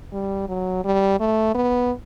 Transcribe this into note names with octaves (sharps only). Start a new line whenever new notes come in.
G3
F#3
G3
A3
B3